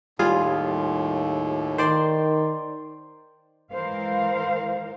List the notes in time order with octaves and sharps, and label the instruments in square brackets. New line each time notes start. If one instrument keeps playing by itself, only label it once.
[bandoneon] D#2 A2 [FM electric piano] G3 F4 G#4
[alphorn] D#3 [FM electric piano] C5 D5 C6
[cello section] E3 G#3 A#4 C5 F5